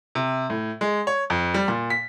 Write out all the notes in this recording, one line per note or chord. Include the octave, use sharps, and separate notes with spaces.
C3
A2
G#3
C#5
F2
G3
A#2
B6